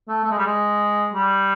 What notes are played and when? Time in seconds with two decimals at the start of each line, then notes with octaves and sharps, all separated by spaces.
0.08 A3
0.24 A3
0.31 G#3
0.38 G3
0.46 G#3
1.14 G3